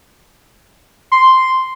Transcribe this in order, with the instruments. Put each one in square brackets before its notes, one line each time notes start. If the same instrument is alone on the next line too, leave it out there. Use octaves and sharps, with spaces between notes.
[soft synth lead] C6